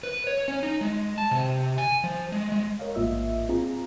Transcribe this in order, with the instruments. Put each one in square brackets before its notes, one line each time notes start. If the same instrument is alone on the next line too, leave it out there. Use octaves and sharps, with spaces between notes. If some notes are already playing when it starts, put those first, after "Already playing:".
[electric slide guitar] B4
C#5
C#4
D#4
G#3
A5
C3
G#5
F3
G#3
G#3
[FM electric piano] A#4 C#5 D#5 F5
A1 G#2 A#3 F4 D#5 E5
C4 F4 G#4 A#5